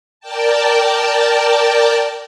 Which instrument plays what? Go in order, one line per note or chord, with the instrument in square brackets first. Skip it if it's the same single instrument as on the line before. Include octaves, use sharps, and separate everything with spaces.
[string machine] A#4 D5 G5 A5